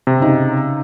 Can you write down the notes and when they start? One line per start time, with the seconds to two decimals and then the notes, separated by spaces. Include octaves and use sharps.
0.07 C3
0.20 C#3 D#4